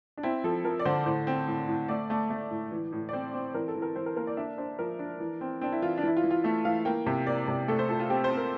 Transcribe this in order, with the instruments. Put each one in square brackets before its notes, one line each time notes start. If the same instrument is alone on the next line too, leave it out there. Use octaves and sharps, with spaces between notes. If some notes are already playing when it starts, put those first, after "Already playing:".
[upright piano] D4
C4 E4
F3 A4
F3 A#4
D5
D3 C5
A2 C5
C4
A2
A2
A3 D5
A3
A3
A2
E3
A2
D5
C4 C5
C4
E3 A#4
A4
E3
A#4
E3 C5
A#4
A#3 A#4
D5
D4 E5
D4 C5
F3 A#4
D4
E3
C4
C4 D4
E4
E3 F4
D4
E3 E4
F4
E3
F4
A3 E5
E3 F5
A#3 G5
C3
A#3 D5
C3
A3 A4
C5
A#2 A4
F4
C4 G4
C5
C4
A#4